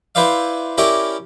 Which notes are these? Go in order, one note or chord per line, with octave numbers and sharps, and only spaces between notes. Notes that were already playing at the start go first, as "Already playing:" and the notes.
E4 B4 C5 D5 F5
C#4 E4 G4 A#4 D5